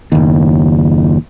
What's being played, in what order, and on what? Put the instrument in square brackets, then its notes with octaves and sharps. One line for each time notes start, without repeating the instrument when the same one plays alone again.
[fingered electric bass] F#1 D#2